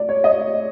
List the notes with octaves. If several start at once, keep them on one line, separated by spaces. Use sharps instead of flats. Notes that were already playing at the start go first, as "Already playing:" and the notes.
Already playing: D5
C#5
D#5